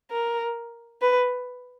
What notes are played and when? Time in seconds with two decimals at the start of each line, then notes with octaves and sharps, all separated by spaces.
0.11 A#4
1.01 B4